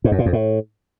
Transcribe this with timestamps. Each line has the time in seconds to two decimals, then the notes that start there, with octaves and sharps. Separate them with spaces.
0.04 G#2
0.12 F#2
0.19 A#2
0.26 F2
0.33 A2